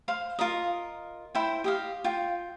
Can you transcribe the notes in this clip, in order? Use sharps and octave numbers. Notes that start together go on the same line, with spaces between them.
C5 F5 C6
F4 A#4 D#5
E4 C5 G5
G4 D#5 F5
F4 G5